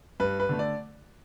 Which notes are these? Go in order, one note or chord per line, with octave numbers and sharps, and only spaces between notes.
G2 B4
B4
D3 A3
D5